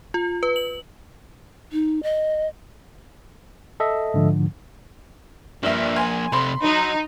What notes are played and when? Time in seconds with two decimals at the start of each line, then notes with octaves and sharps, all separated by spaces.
0.14 F4
0.43 B4
0.56 F#7
1.72 D#4
2.03 D#5
3.80 A4 D#5 E5
4.14 G#2 D3 F3
5.63 G2 F3 A#3 E5
5.96 G#5 C6
6.32 C3 A4 B5 C6
6.64 F#3 D#4